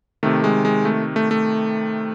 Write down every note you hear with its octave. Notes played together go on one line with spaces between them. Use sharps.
C3 D#3 A3
G#3
G#3
A3
A3
A3